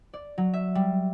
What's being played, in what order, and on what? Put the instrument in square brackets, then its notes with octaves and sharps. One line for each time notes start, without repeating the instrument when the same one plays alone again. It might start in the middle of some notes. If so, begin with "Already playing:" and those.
[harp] D5
F#3
E5
G3